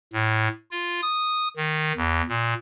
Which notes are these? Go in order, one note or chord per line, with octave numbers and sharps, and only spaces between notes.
A2
F4
D#6
D#3
E2
A#2